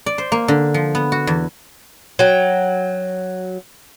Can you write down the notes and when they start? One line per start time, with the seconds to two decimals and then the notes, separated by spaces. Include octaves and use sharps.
0.06 D5
0.18 C5
0.32 A#3
0.48 D3
0.74 F3
0.95 B3
1.12 F#4
1.27 E2
2.19 F#3 G5